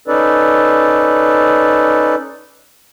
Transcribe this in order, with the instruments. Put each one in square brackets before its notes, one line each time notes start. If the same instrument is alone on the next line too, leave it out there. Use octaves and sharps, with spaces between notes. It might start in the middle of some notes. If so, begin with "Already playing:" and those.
[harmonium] C#4 D#4 A4 B4 D5